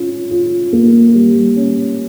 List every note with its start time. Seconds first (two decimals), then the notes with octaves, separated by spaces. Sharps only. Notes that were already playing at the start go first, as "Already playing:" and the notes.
Already playing: C#4 F4
0.31 F4
0.73 A#3
1.14 G3
1.56 C#4